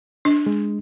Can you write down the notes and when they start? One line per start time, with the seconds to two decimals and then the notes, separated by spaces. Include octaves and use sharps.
0.25 D4
0.46 G#3